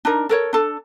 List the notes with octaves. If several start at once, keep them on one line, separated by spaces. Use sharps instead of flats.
D4 D#4 A#4
A4 A#4 C#5
D4 A4